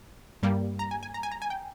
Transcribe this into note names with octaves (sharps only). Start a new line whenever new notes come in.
G2 G3 A#3
A#5
G#5
G#5
A#5
G#5
A#5
G#5
G5